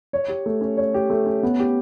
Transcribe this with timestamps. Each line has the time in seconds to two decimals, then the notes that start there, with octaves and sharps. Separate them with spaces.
0.13 C#5
0.28 G4
0.46 A3
0.61 C#4
0.77 C#5
0.94 G4
1.10 A3
1.26 C#4
1.43 B3
1.59 G4